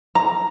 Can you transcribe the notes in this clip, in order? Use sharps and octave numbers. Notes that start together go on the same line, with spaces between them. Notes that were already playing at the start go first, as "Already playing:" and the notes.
A#5